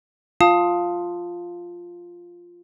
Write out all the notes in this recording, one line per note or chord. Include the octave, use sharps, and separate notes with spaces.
F4 F5 A5 D#6